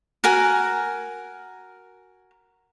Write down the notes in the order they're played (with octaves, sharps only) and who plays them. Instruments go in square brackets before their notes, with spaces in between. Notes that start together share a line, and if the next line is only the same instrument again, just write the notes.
[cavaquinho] F#4 A#4 G#5